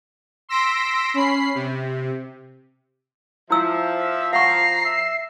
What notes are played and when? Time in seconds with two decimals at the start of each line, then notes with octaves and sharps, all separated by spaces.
0.49 C6 E6 A#6 B6 D7
1.14 C#4 B5 C7
1.55 C3
3.51 F3 E4 E5 E6
4.33 F5 F#5 A#5 C#6 C7
4.85 E5